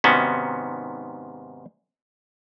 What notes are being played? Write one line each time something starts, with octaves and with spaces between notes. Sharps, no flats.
G#2 C3 D#3 B3 C#4 F#4